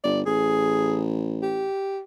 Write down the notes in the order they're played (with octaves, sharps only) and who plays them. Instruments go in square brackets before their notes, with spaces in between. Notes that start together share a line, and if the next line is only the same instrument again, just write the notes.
[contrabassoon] G1 [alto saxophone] D5
[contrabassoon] A1 [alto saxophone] G#4
[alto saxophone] G4